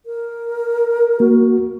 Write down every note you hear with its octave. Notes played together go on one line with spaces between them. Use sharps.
A#4
A#3 F#4